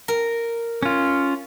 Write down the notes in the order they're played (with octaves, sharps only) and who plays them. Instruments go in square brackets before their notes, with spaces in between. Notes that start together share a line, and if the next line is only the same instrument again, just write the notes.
[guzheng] A#4
[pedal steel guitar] C#4 F4